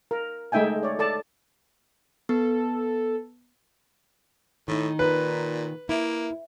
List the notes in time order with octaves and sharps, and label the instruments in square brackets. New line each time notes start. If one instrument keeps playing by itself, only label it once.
[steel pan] A#4
G#3 A3 D#4 E5 G5 G#5
C#5 D5
A4 D5 A5
[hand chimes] B3 [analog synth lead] A4
[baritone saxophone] A2 [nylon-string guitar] D#3 D#4
[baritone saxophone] A#2 [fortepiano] B4
[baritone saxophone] A#3 [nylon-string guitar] E4